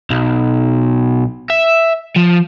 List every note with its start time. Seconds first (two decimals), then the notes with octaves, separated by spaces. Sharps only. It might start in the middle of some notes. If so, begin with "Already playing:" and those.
0.10 B1
1.50 E5
2.16 F3